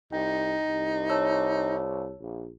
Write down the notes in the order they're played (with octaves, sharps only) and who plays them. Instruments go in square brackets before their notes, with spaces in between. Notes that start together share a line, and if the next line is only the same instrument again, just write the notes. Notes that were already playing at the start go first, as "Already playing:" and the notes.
[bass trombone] C2 [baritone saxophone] D#4 [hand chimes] G5
[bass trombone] C2
[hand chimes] C#5 A5 E6
[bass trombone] A#1